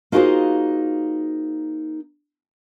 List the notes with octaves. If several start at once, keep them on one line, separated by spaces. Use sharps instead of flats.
A#3 D#4 F4 F#4 G#4 C5